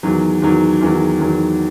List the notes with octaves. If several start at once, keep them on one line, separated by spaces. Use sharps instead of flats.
E2 D#3 F#3
E2 D#3 F#3
E2 D#3 F#3
E2 D#3 F#3